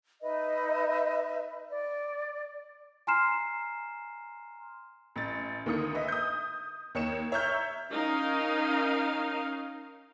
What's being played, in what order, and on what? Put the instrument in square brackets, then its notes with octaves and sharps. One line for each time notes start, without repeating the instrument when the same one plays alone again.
[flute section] D#4 B4 D#5 E5
D5
[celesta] G#5 A#5 C6 F6 C7 E7
[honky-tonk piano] A1 A6
D2 D#3 A#3 D#6 C#7
B4 D#5 E5
D#6 G6
D#2 C#5 C#7 E7
C#5 E5 A#5 C#6 F6 G6
[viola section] C#4 D#4 A#4 F5